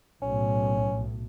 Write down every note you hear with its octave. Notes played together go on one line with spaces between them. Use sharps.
B1 A2 C#4